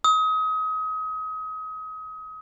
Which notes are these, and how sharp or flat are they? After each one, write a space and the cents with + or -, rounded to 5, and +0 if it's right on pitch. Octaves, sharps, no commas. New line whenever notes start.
D#6 +30